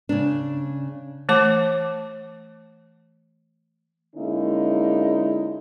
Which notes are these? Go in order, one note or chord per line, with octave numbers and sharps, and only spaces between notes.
C#3 D4
E3 A3 A5 D6
D3 G#3 A#3 C#4 D#4 E4